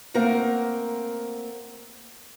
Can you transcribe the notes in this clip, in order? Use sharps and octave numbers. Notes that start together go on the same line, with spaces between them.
A3 A#3 C4 A#4 F#5